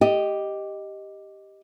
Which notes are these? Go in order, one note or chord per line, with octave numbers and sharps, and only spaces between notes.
G4 D#5